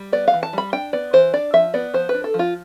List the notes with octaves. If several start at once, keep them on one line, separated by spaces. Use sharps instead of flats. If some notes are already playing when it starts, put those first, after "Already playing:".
Already playing: G3
B3 D5
F5
E3
A5
G3 B5
D4 G5
B3 D5
E3 C5
D4 D5
F3 E5
B3 D5
F3 C5
D4 B4
A4
F3
F4